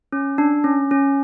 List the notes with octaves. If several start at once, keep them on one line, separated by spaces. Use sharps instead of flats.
C#4
D4
C#4
C#4